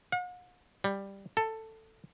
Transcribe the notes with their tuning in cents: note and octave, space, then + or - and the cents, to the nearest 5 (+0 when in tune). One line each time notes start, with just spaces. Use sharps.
F#5 -45
G3 +5
A4 +10